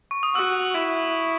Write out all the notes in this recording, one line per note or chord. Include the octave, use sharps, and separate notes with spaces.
C#6
D#6
F#4 E6
E4